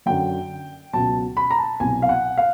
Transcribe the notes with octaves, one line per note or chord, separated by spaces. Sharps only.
F#2 D3 F#3 G5
C#2 B2 F#3 A5
B5
A#5
A5
C2 B2 F#3 G#5
F5
F#5
F5